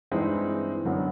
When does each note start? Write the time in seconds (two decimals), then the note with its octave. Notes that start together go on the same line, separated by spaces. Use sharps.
0.11 G2 E3 G#3 C4 D#4
0.85 F#2 D3 F#3 B3